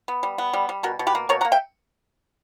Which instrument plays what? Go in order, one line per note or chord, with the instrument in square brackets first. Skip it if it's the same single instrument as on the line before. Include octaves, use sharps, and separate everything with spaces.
[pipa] B3
G3
B3
G3
G3
B2 F#4 A#4
B2
G4 B4
A#3
B2 A#4 C#5
F#5 A#5
A#3
E5 G5